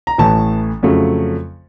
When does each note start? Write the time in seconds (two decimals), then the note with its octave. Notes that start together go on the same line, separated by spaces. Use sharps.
0.07 A#5
0.18 A1 A2 E3 A3 A5
0.83 F2 C#3 F#3 A3